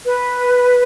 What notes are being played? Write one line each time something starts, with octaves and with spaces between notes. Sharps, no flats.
B4